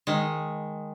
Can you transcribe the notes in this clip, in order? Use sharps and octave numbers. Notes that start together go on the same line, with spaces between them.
D#3 G#3